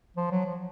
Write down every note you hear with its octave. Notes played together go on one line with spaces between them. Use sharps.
F3
F#3
F3